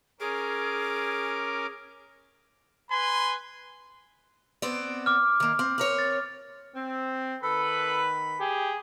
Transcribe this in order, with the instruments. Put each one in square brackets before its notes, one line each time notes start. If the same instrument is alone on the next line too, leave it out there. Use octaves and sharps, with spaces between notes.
[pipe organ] C#4 A#4 D6 [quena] G#4
[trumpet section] B4 G#5 B5 C6
[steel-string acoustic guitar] B3 C4 D5
[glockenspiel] D6 F6
[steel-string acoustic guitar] D#3 A#3
C4
C4 A#4 C#5
[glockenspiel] A6
[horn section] C4
[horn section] D#3 B5 [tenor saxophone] A4 [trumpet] B4
[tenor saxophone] G4 [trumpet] G#4